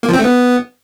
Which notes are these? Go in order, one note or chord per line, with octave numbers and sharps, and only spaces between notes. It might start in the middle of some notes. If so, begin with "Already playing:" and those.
A#3
F3
C4
A3
B3